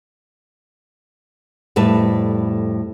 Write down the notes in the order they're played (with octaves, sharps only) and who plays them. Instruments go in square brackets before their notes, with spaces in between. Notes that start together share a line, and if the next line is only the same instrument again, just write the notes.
[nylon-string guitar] F2 A2 G3 B4 A5